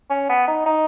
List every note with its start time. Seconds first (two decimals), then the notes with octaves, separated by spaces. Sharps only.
0.10 C#4
0.29 B3
0.48 D#4
0.66 D#4